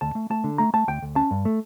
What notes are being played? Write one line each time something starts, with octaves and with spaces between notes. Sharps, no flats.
D2 A5
A3
A3 A5
D3
A3 A#5
A3 A5
D2 G5
D2
C#4 A5
G2
A3